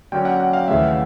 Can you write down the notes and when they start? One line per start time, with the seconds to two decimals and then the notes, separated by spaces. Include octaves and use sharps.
0.12 D3 F#3 A#3 C#4 G5
0.25 F#5
0.40 F#5
0.53 F5
0.68 D#2 C#3 E3 A3 E5